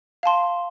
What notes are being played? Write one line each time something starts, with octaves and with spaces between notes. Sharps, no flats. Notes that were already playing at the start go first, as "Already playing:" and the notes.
F5 A5 C6